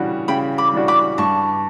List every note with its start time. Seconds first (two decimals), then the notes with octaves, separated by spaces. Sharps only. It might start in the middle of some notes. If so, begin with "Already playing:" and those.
Already playing: C#3 E3 G3 D4 F#4
0.28 C#3 G5 B5
0.58 B5 D6
0.74 E3 G3 D4 F#4
0.88 B5 D6
1.18 G2 A5 C#6